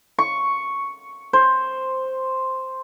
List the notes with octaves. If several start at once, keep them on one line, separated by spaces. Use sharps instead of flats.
C#6
C5